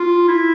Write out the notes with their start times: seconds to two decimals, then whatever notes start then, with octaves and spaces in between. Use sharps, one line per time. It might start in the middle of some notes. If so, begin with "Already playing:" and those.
Already playing: F4
0.28 E4